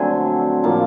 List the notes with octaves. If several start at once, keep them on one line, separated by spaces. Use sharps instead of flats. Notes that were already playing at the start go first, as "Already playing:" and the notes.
Already playing: D3 F#3 A3 C4 G#5
A2 F3 A#3 A5